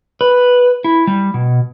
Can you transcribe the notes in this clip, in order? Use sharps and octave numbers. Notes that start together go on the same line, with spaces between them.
B4
E4
G3
B2